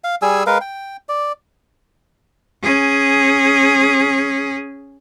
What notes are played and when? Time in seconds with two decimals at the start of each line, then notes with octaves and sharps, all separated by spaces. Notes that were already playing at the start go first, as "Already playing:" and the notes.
0.04 F5
0.22 G3 G#4 G#5 E6
0.47 G#3 A#4 B4 F5
0.61 G5
1.09 D5
2.63 C#4 G#4